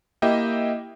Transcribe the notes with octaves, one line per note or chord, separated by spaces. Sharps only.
A#3 E4 G4 D#5 E5 G5